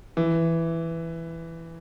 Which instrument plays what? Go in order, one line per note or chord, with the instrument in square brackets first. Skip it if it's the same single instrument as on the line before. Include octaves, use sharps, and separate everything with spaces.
[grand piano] E3